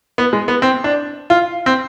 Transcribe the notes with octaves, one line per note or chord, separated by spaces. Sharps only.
B3
G#3
B3
C4
D4
F4
C4